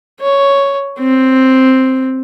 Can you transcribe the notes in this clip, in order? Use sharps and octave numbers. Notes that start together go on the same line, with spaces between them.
C#5
C4